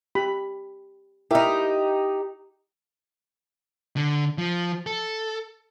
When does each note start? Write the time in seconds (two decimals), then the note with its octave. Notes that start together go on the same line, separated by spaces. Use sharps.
0.15 G4 B5
1.31 D#4 E4 G4 A#4 E5
3.96 D3
4.38 F3
4.86 A4